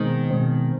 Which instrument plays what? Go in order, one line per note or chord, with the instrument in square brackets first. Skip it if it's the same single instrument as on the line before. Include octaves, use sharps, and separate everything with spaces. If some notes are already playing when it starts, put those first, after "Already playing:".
Already playing: [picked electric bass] B2 G#3 C4 [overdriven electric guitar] D#3
[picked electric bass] B2 G#3 C4